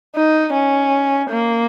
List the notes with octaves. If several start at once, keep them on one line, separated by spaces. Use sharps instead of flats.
D#4
C#4
A#3